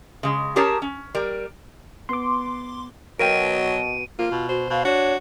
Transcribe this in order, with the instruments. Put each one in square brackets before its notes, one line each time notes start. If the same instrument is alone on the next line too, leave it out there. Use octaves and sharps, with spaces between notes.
[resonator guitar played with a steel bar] C#3 G#3
C#4 G4 G#4 A#4 C#5 A5
C#4
G3 A#4
[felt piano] B3 [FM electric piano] C6 D6
[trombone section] B2 [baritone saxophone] F#3 [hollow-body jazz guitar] A#4 F5 G5 [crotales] D7 D#7
[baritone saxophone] A#3 [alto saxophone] F4
[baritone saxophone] B2
[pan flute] F#4 [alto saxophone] C5
[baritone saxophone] B2 [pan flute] F5
[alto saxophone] D4 [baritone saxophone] F#4 [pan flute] C#5